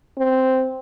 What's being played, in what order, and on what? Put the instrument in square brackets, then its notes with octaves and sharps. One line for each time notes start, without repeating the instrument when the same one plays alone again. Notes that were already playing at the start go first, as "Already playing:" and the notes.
[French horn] C4